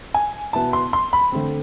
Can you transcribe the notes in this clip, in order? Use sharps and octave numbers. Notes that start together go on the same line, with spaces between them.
G#5
B2 B3 E4 A5
C6
C6
B5
D3 A3 C4